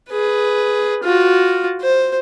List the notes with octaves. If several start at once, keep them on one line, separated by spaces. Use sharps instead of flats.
G#4 B4
F4 F#4
C5